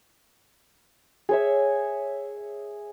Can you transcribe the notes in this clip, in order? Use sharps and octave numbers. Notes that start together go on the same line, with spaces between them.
G#4 C#5 E5